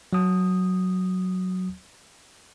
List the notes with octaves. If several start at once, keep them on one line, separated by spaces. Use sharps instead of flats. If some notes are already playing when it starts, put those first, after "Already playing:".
F#3 D#6